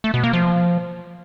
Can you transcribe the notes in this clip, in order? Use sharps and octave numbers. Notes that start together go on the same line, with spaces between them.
A3
B2
A#3
F3